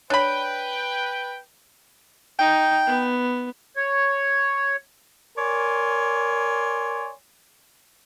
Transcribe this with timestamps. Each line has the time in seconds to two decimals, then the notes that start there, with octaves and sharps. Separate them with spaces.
0.10 D4 B4 C#5 G5 B5
2.39 D#4 G5
2.87 B3
3.76 C#5
5.36 A#4 C#5 D5 G#5 C6